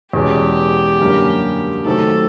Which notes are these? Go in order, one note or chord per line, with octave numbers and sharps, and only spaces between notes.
E2 B2 G#3 C#4 G4
F#2 D3 G3 A#3 C#4
C3 D#3 F#3 A3 C4 A4